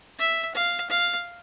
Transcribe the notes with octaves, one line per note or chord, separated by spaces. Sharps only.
E5
F5
F5